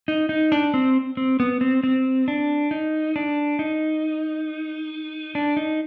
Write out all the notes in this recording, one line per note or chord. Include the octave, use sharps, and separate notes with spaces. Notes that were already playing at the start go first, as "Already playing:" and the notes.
D#4
D#4
D4
C4
C4
B3
C4
C4
D4
D#4
D4
D#4
D4
D#4